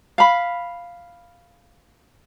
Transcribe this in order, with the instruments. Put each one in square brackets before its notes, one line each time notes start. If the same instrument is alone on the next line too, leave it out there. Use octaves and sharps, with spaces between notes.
[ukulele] F5 B5